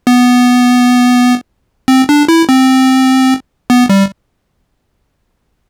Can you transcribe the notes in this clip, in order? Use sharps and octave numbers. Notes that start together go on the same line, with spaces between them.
B3
C4
D4
E4
C4
B3
G3